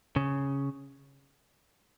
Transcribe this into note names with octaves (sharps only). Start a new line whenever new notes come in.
C#3